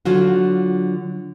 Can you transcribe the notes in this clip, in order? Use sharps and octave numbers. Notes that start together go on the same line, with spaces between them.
D3 F#3 F4 F#4